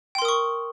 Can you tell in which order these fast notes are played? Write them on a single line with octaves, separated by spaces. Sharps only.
G5 C6 A#4 D#6 C#6